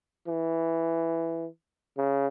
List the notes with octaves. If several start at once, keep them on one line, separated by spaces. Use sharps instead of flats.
E3
C#3